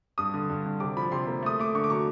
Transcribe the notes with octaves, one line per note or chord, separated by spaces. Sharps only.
G2 D#6
D3
G2
D3
C3 D6
F3 B5
C3 C6
A#3
A3 D#6
A3 D6
D3 C#6
D6
F#3 C#6